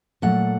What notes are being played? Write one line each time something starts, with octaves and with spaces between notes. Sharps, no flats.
A#2 F#3 A3 F#5